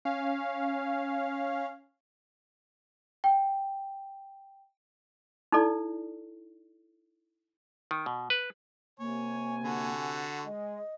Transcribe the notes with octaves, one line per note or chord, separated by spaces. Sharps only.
C#4 F5
G5
D#4 E4 A4 D5
D#3
B2
B4
C3 A#3 C#5 G#5
D3 F#4
G#3 D#5